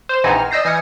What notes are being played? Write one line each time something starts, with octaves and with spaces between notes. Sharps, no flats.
C5 E7
A#1 E3 C4 D#4 F#5 G#5
F6
D5 D#5 E6 G6 A#6 C7
E3 G#5 D#6 F6 C#7